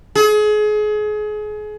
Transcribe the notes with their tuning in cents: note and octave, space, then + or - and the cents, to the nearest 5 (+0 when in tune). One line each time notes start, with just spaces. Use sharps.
G#4 +30